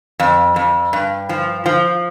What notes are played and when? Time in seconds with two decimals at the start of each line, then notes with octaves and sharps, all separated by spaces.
0.19 F2
0.56 F2
0.93 G2
1.29 F3
1.66 F3